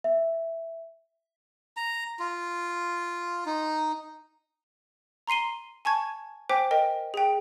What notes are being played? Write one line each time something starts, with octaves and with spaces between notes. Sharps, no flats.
E5
A#5
F4
D#4
A#5 C6 C7 D#7 G7
G#5 A5 C#6 G#6
C5 G5 G#5 D6 B6
A#4 D#5 G5
G#4 G5